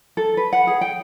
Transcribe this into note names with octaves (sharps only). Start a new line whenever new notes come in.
A4
B4
F#5
G#4
G5